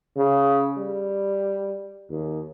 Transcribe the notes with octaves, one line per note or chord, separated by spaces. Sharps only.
C#3
G3
D#2